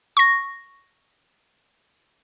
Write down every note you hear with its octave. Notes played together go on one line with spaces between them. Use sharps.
C#6 A#6